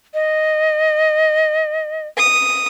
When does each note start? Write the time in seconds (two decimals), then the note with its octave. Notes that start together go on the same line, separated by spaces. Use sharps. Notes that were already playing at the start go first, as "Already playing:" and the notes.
0.14 D#5
2.18 D#6